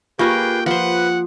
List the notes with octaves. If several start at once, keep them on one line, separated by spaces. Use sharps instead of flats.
A#3 F4 G4 G#4 A#4 B4 G5 C#6
F3 B4 C5 F#5